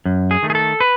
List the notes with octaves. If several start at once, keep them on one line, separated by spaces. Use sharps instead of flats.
F#2
G#4
D#3 A3
G#4
A4
B4